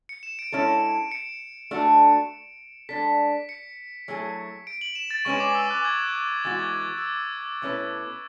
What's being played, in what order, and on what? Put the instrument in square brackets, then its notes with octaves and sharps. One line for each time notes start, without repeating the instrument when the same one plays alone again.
[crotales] C#7
E7
D7
[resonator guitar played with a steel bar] G#3 C#4 E4 A4
[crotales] C#7
[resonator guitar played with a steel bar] A3 D4 F#4 A4
[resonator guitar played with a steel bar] G#3 D4 A4 [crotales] B6
[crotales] C#7
[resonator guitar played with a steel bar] F#3 A3 E4 G#4
[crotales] D7
F#7
E7
A6
[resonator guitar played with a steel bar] G#3 C#4 G#4 B4 [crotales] C#6
[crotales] D6
E6
F#6
G#6
F#6
D6
[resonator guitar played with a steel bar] E3 G#3 B3 F#4 [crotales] A6
[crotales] G#6
F#6
F#6
E6
D6
E6
[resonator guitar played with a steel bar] B2 A3 C#4 E4 B4